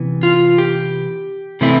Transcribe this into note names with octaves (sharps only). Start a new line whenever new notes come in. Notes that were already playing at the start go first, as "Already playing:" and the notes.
Already playing: C3 E3 B3
F4
G4
C3 E3 A3 C4 E4